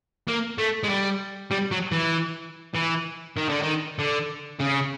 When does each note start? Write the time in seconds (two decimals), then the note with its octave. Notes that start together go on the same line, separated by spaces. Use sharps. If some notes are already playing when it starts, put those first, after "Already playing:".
0.28 A#3
0.58 A3
0.83 G#3
0.89 G3
1.51 G3
1.71 F#3
1.92 E3
2.75 E3
3.37 D#3
3.49 D3
3.62 D#3
3.99 D3
4.60 C#3